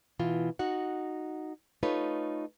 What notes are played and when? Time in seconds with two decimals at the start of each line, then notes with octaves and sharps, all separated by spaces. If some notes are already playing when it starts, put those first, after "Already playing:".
0.19 B2 E3 F4
0.59 D#4 F#4 F#5
1.83 A3 D#4 F4 B4 C#5